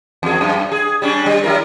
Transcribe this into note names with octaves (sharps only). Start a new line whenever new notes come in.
E2 G#4
F#2
G#4
G3 C#4 D4
G3
F#3 E4 A#4